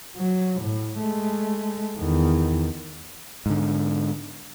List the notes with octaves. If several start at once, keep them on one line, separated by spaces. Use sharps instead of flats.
F#3
A2
G#3 A3
E2 D#3
G#2 D3